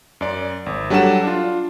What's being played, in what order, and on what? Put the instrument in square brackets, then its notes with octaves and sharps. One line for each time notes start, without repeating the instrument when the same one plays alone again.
[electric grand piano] F#2 D5
G#1
F#3 G3 D4 A4 F#5 E7
D4 F4